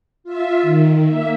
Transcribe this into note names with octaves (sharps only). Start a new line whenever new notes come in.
F4 E5
D#3
A#3 E5